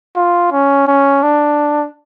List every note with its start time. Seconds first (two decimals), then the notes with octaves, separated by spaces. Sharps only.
0.16 F4
0.52 C#4
0.88 C#4
1.23 D4